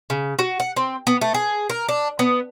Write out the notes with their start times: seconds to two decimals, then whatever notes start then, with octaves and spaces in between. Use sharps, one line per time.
0.10 C#3
0.39 F#4
0.60 F#5
0.76 C4
1.07 B3
1.21 A3
1.34 G#4
1.69 A#4
1.88 D4
2.19 B3